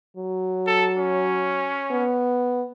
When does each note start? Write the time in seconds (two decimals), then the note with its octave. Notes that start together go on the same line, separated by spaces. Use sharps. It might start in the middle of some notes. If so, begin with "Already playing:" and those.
0.17 F#3
0.67 A4
0.97 C#4
1.91 B3